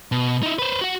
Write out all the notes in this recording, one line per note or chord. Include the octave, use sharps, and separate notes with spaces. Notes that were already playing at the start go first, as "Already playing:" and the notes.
B2
D#4 E4
B4 C5
F#4 F#5